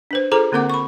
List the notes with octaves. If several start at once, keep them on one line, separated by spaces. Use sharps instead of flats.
D4 B4 C5
F4 G#4 A4 C5 A#5 D6
D3 A#3 C4 A#4 F#5 D6
B5 C#6